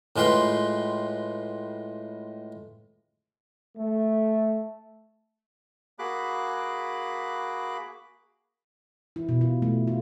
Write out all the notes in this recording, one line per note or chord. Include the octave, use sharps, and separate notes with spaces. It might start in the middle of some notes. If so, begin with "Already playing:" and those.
A2 G#3 F4 B4 G5 C6
A3
A#3 F#4 G#4 B5 D6 F#6
E4
B2
F4
A3
F4